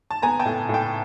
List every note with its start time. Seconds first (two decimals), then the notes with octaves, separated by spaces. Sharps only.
0.11 A5
0.22 B3 G#5 A#5
0.39 G5 A5
0.45 A2
0.69 A2
0.74 G5 A5